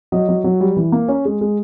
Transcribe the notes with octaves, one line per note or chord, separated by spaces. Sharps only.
F#3 D#5
F#3
F#3
G3
E3
A#3
C#4
G#3
G#3